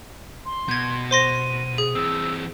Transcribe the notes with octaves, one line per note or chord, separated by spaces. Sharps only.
C6
B2 G6 G#6
C5 C6 A#6 D#7
G#4
E3 C4 E6